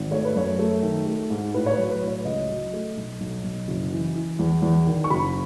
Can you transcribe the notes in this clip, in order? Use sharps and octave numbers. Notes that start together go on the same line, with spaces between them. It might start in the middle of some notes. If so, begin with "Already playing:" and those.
Already playing: G#1
A3 C#5
B4
F#2 C#5
A3
D#3
A3
G#2
A2 B4
C#5
B4
F#3
B4
A2
C#5
C#2 D#5
F#3
A3
B1
B1
B1
F#1
E3
E3
E2
E2
D#3
C#6
F#1 B5